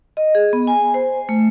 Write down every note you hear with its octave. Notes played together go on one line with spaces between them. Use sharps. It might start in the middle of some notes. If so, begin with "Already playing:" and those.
D#5
G#4
B3
G#5
C5
A3